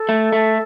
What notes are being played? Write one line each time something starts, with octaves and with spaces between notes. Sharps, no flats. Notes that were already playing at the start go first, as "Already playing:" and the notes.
Already playing: A4
A3
A3